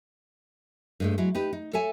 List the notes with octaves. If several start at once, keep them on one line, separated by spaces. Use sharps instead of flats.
G2 G#3 A3
F#3 G#3 E4
D#4 G4 B4
D#4
A4 C#5 E5 G#5